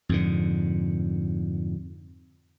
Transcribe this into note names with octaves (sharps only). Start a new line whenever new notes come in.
F2 G#2 D3